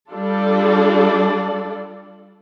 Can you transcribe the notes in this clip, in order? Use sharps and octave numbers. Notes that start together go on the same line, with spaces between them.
G3 D4 F4 A4 D5